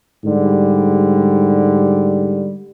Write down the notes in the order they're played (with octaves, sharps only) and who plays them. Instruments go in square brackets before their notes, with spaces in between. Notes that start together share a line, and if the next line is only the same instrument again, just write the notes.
[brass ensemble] G#2 D3 G3